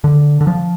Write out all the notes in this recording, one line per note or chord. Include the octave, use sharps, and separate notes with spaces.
D3
D3
F3